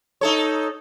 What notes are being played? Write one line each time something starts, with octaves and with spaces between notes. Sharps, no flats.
D#4 A4 C#5